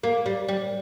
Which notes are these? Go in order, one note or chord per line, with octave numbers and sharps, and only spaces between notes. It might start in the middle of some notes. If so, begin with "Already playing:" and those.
A#3
G3
G3